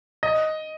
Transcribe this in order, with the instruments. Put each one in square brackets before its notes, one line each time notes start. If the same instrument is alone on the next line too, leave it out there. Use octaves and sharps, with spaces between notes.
[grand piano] D#5